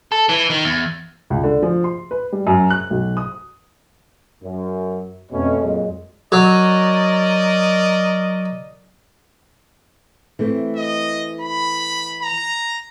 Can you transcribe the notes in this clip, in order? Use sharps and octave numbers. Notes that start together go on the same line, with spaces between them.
A4
E3
D#3
E2
C#2
D3
F3
C6
B4
G3
F#2
F#6
B1
D#6
F#2
F2 B2 A3 C#4
A#2 F#3 G#3
F#3 A#4 D5 D#5
E3 A3 C4
D#5
B5
A#5